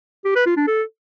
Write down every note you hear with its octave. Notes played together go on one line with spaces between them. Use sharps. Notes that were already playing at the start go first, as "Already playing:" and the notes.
G4
B4
F4
D4
A4